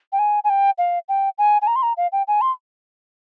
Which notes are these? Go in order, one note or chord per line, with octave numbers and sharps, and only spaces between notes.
G5
G#5
G#5
G5
F5
G5
G#5
G#5
A#5
C6
A#5
F5
G5
G#5
C6